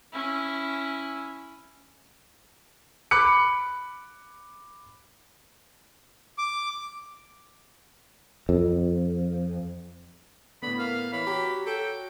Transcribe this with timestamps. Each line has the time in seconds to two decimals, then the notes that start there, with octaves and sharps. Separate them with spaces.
0.12 C#4 E4
3.11 B5 D6 F#6 C#7
6.38 D6
8.49 F2
10.63 A2 D3 B3 B5
10.79 A#3 F5
11.13 E3 C#5 B5
11.27 F#4 G4 C#5 A#5
11.67 A4 G5